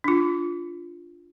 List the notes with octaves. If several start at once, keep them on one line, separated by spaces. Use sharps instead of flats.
D4 F4